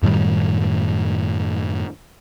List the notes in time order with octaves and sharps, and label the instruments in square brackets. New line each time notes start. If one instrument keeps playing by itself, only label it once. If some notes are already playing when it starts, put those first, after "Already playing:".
[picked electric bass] F#2 A2 D#3 G3